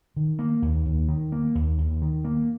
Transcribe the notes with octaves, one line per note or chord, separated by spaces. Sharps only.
D#3
A#3
D#2
D#2
D#3
A#3
D#2
D#2
D#3
A#3